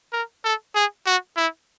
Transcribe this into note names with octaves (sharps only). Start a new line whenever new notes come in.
A#4
A4
G#4
F#4
E4